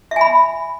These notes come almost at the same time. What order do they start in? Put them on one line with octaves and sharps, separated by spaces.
E5 G#5 B5